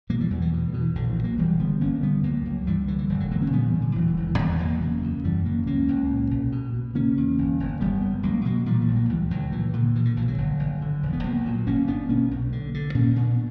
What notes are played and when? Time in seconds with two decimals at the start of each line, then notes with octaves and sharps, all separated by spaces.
0.09 B2 F#3 A#3
0.20 E3 G3
0.30 E2 E3 G3
0.42 E3
0.53 B2
0.67 D3
0.74 B2
0.81 E3
0.95 A#1 D3
1.09 E3
1.17 A#2
1.24 F#3 A#3
1.38 E1 E3 G3
1.59 D3 G3 B3
1.81 G1 A#3 C#4
1.95 A#3
2.02 D3 G3 B3
2.23 C#2 F#3 A#3
2.46 C#2
2.67 G2 E3 G3
2.88 D3 E3
2.98 E3
3.09 E1 E3
3.20 D3 F#3
3.31 D3 F#3 A#3
3.42 A#3 C#4
3.52 A#2 G3 B3
3.67 E3 G3
3.74 A#2
3.81 D3 F#3
3.95 E1 E3
4.06 E3
4.17 E1 E3
4.27 E3
4.38 E2 E3 G3
4.52 G3
4.59 E2 F#3 A#3
4.81 C#3 F#3 A#3
5.02 D2
5.24 F#2 E3 G3
5.45 C#3 F#3 A#3
5.67 C#2 A#3 C#4
5.88 C#2
6.10 A#2
6.31 B1
6.52 B2
6.74 B2
6.95 C#3 A#3 C#4
7.17 E2
7.38 G1
7.60 G1
7.80 F#1 G3 B3
8.02 F#2
8.23 C#2 F#3 A#3
8.45 B2 F#3 A#3
8.66 A#2 E3 G3
8.81 E3 G3
8.88 A#1
8.95 F#3 A#3
9.09 C#2 E3 G3
9.30 C#2 D3 F#3
9.52 A#2 E3
9.73 A#2 D3
9.95 B2 E3
10.05 D3
10.17 B1 E3
10.27 D3 F#3
10.38 G1
10.59 G1
10.81 D3
11.03 E1
11.13 B3
11.23 B1 F#3 A#3
11.46 A#2
11.67 G1 A#3 C#4
11.87 G1 B3 D4
12.09 B2 A#3 C#4
12.31 B1
12.52 D3
12.74 D3
12.95 A#2 A#3 C#4
13.16 A#2 B3 D4